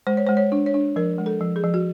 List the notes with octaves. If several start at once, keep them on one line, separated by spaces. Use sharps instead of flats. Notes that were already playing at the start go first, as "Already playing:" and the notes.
G#3 C5
C#5
G#3 C5
C#5
D4
C#5
D4
F3 A#4
G#3
A4
F3
G#4
F3
F#4